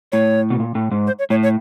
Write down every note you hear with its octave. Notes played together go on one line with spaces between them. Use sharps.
A2 C#5
B2
A#2
A2
G#2
C5
C#5
A2 C#5
C#5